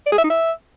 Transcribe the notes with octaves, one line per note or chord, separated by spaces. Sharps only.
D5
G#4
E5
D#4
E5